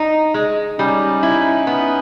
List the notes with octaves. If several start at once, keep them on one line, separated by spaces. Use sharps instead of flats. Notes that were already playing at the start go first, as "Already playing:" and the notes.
Already playing: D#4
G#3
G3 C#4 D#4
E4
B3